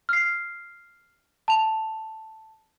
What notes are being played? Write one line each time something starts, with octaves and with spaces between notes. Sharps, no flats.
F6 C7
A5 F7